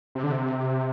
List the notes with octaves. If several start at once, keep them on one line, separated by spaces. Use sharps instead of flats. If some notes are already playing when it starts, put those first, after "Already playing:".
C3
D3
C3